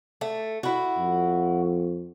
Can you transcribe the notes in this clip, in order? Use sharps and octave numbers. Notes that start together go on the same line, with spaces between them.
A3
E4 F#4
F2